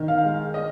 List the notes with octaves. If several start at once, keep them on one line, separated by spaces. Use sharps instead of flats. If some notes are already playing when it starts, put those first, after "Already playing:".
Already playing: D#3
F5
G#3
D#5